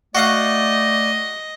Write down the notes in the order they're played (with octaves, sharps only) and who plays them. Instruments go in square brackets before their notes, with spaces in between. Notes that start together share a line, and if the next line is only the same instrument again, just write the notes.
[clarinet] A3 [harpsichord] F#4 F5 F#5 [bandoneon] D5 [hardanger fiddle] D#5